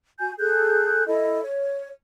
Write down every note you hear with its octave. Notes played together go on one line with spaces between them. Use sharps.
F#4 G#5 G6
G#4 A4 F#6 G6
E4 A4 D#5
C#5